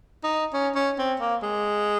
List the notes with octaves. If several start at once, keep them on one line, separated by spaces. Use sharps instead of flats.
D#4
C#4
C#4
C4
A#3
G#3